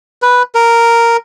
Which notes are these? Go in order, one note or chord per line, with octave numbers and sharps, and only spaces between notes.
B4
A#4